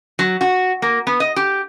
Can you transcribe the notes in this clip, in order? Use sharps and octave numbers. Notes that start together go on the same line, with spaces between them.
F#3
F#4
A#3
B3
D#5
G4